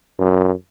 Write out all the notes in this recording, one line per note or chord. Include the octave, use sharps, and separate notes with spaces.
F#2